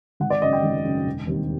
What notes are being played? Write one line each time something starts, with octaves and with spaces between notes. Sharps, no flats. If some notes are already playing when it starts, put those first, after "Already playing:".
G#1 F#5
D5
F#2 C#3 F#3 D#5
G5
G#1
F#2 C#3 F#3
E1
D#2 D#3 G3 C4